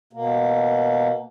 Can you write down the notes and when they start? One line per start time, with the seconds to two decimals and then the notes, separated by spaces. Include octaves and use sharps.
0.13 B2 A#3